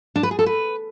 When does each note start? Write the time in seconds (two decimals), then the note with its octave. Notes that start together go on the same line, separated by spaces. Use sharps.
0.16 D4
0.23 B4
0.31 G#4
0.39 A4
0.46 B4